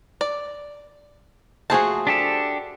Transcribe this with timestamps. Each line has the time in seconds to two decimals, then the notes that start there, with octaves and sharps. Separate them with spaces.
0.21 D5
1.70 F3 A3 F#4 G#4 C5 A5
2.07 D4 G4 A4